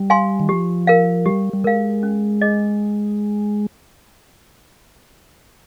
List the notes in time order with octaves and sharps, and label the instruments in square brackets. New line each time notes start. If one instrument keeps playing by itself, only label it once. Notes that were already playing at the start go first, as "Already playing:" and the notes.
Already playing: [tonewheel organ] G3
[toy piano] F5 G#5 C6
[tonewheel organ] D#3
[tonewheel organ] F3 [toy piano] G4
[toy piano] A#4 F5
[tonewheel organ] G3 [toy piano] G4
[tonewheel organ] G3
[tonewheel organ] G#3 [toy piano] A#4 F5
[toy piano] C#4
G#4 D#5